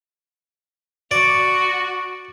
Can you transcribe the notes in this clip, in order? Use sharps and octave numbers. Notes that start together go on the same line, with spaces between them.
F#4 D5